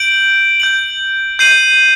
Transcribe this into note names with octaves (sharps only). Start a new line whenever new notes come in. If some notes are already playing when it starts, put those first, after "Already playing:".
Already playing: G6 D7 F#7
G6 D7 F#7
G6 C7 D#7 F#7